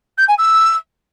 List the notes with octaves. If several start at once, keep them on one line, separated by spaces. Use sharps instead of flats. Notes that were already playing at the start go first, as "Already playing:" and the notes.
G6
G#5
E6